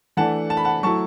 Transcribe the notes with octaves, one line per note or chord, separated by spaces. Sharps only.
E3 A3 D4 F#5 A5
A5
B5
F#5 A5
F#3 A3 E4 A5 C#6